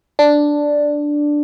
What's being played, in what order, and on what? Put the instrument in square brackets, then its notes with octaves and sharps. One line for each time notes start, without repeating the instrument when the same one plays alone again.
[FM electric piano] D4